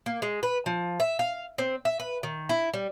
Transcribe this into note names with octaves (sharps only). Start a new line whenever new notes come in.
A#3
G#3
B4
F3
E5
F5
C4
E5
B4
D#3
E4
G3